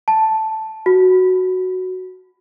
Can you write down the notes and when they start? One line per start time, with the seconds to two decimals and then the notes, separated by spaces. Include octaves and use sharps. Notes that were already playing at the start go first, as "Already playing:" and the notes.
0.08 A5
0.86 F#4